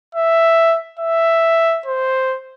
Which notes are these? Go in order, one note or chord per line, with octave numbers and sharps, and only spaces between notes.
E5
E5
C5